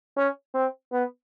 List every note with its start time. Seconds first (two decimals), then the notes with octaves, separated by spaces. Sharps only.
0.17 C#4
0.54 C4
0.92 B3